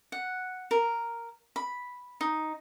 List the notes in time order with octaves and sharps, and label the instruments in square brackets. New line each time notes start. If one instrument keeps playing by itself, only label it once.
[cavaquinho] F#5
A#4
B5
D#4